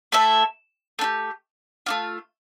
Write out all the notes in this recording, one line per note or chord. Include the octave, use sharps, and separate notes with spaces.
A3 E4 A4 E5
A3 D4 G4
A3 D4 F4